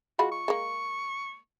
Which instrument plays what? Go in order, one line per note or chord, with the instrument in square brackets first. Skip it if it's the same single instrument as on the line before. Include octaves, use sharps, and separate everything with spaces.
[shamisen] G#3 F4 B5 [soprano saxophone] F#4
[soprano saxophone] C#6
[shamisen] G#3 A#3